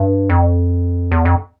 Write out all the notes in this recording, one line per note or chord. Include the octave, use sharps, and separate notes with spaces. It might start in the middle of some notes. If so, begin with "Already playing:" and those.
Already playing: G2
F2
E2
F2